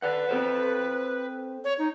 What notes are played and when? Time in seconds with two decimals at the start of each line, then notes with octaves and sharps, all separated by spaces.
0.02 B4 D5 F#5
0.29 C4 A4 C5
1.64 C#5
1.79 D#4